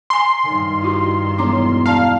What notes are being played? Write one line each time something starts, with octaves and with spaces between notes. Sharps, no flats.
G#5 A#5 C6
G2 D#3
E4 F#4 G4
E1 C#5 A#5 D6
D5 F5 A5 A#5